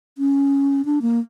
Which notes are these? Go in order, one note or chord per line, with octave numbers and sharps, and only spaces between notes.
C#4
D4
A#3